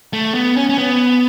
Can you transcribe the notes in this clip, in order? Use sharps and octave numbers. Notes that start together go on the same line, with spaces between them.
A3
B3
C#4
C#4
B3